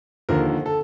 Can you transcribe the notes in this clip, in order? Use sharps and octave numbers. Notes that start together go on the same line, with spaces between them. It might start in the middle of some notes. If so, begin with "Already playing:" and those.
D#2 D3 F3 A#4
A4